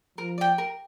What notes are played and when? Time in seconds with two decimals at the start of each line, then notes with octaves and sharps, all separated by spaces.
0.18 F3 A#4
0.38 D5 G5
0.58 A#4